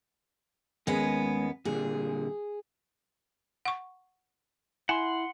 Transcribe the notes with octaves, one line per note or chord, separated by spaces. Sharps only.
D#2 G#3 B3 C#4 G#4
A#2 D3 G3 G#4
F#5 C#6
E4 F#5 G#5 C6